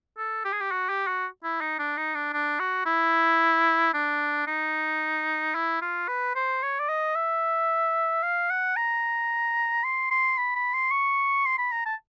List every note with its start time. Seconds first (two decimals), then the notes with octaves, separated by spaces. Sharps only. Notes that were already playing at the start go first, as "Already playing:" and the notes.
0.18 A4
0.45 G4
0.53 G#4
0.61 G4
0.71 F#4
0.89 G4
1.08 F#4
1.44 E4
1.61 D#4
1.79 D4
1.98 D#4
2.15 D4
2.33 D4
2.60 F#4
2.86 E4
3.94 D4
4.47 D#4
5.55 E4
5.82 F4
6.08 B4
6.35 C5
6.63 C#5
6.79 D5
6.89 D#5
7.16 E5
8.23 F5
8.50 F#5
8.76 A#5
9.84 C6
10.11 C6
10.38 B5
10.56 B5
10.74 C6
10.91 C#6
11.46 C6
11.58 B5
11.72 A#5
11.86 A5